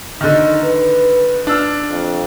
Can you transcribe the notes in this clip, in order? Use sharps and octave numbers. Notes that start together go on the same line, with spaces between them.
D3 D#3 D#4
B4
D4 E6 F6
F2